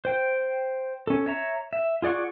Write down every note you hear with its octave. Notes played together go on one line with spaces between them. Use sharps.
C5 G5
C#4 A4
C#5 E5 A#5
E5
F4 G#4 D5 F#5 C#6